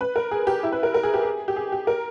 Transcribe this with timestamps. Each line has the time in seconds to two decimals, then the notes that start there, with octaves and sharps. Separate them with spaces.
0.01 B4
0.16 A#4
0.31 G#4
0.47 G4
0.63 E4
0.72 B4
0.83 A#4
0.94 A#4
1.03 G#4
1.14 G4
1.23 G#4
1.48 G4
1.56 G#4
1.72 G4
1.87 A#4